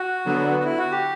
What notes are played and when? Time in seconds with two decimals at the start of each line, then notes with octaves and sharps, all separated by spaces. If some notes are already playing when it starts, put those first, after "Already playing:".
Already playing: F#4
0.25 D3 F#3 B3
0.59 F#4
0.64 E4
0.78 F#4
0.92 G4